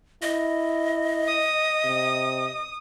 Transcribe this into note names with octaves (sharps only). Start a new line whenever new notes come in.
E4 D#5
D#6
C3